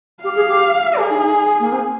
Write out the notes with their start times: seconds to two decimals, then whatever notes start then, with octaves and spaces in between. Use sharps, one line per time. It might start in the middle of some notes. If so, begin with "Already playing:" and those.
0.23 G4 F5
0.35 G#4
0.48 G4
0.97 G4 G#4
1.10 D#4
1.22 D#4
1.60 A#3
1.72 C4